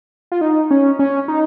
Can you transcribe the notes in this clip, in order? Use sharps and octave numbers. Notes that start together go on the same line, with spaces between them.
F4
D#4
C#4
C#4
D#4